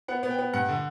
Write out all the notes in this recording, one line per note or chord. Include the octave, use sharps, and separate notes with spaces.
B3 F#5
B3
G5
B3
G2 F#5
D3